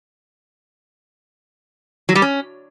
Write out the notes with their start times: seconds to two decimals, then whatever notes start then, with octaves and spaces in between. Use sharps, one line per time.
2.09 F#3
2.15 G3
2.22 C#4